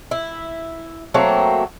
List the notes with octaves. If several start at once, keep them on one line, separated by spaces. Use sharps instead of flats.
E4
F#3 A3 A#3 C4